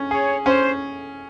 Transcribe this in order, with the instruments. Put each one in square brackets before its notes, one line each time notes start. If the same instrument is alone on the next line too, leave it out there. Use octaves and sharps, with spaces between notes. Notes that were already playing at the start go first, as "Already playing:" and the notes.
Already playing: [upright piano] C#4
[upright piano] G#4 [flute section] C#5
[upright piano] C#4 [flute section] C5